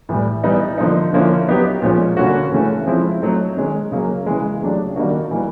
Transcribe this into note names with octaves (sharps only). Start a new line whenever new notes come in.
A2 E3 G3
E3 G3 B3 D#4
D3 F3 A#3 D#4
D3 F3 A#3 C#4 E4
F#3 B3 D#4 G4
A#2 F3 G#3 C#4
D3 G3 A#3 C#4 F#4
C#3 E3 A3 C#4
F3 G#3 C4 E4
F#3 A3 C4 D#4
D#3 G#3 C#4
C#3 F#3 A#3
C#3 E3 G#3
C#3 F#3 A3 D4 G4
D#3 G3 A#3 D4 F#4
E3 G3 A#3